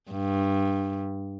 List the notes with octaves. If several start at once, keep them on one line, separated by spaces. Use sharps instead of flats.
G2